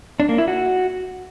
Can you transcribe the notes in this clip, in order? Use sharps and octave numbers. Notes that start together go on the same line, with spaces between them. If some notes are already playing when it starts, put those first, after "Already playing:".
D4
A#3
E4
F#4